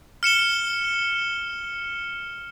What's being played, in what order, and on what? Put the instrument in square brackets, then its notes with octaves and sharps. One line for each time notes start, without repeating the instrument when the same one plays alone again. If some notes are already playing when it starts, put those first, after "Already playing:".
[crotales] F6 C#7 E7 G7